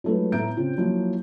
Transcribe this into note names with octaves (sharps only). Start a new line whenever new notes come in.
F#3 G#3 A3 D#4 F4 B4
A2 B3 E5 A#5 G6 D7
C#3 C4 F4
F3 F#3 A#3 E4